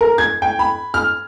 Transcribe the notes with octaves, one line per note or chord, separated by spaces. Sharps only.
A#4
G#6
G5
B5
F6